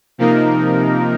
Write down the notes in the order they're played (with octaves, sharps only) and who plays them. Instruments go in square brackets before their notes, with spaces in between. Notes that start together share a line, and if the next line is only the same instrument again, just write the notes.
[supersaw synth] C3 F3 A#3 D#4 A#4